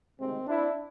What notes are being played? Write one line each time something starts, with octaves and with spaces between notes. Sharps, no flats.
D2 C3 D#3 G#3 C4
D4 E4